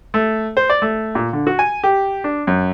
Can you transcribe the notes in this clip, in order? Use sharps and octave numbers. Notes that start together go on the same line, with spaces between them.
A3
C5
D5
A3
A#2
D3
F#4
G#5
G4
D4
F#2